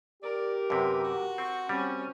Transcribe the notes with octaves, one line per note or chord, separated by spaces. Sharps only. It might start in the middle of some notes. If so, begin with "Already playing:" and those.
G4 A#4 D5
F#2 C3 B4
F#4
C4 C#6
G3 C4 C#4